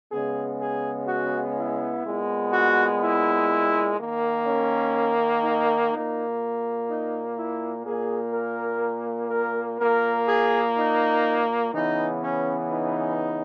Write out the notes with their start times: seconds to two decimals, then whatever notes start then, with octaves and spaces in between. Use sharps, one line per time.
0.11 C#3 G#3 B3 G#4
0.60 G#4
1.07 F#4
1.56 E4
2.04 A#2 G#3 B3
2.52 F#4
3.01 E4
3.98 D#3 A#3
4.46 C#4
5.43 D#4
5.91 A#2 A#3 D#4
6.89 D#4
7.38 E4
7.85 A#2 A#3 G#4
8.33 A#4
9.30 A#4
9.78 A#2 A#3 A#4
10.27 G#4
10.76 D#4
11.73 C#3 E3 B3 D#4
12.21 C#4
12.70 D#4